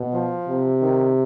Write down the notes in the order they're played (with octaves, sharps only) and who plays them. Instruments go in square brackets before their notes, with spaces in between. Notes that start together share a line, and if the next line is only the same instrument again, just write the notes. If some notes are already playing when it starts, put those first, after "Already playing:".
Already playing: [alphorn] B2
[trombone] F3
[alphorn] C3
[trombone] D#3